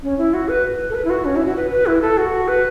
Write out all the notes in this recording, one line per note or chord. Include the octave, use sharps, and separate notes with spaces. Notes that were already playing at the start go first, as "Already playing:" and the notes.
C#4
E4
F#4
B4
A4
B4
E4
F#4
C#4
E4
F#4
B4
B4
E4
A4
F#4
B4